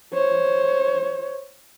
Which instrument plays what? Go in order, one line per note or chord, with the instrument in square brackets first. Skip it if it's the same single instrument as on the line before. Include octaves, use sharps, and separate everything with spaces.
[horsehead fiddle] C5 C#5